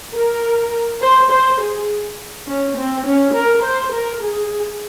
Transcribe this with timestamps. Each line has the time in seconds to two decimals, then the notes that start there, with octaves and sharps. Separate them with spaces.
0.15 A#4
1.01 C5
1.31 C5
1.60 G#4
2.47 C#4
2.77 C4
3.06 C#4
3.34 A#4
3.63 C5
3.93 A#4
4.22 G#4